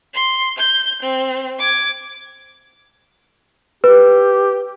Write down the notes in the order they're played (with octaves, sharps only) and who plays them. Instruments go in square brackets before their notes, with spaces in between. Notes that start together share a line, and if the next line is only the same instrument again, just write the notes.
[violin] C6
G6
C4
D6 G#6
[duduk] G4 [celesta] B4